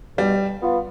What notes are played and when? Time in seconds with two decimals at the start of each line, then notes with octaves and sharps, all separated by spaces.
0.18 B2 G3
0.62 B3 F4